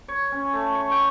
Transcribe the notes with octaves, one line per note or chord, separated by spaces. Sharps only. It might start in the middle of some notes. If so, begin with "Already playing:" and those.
C#5
C#4
A3
C#6
G5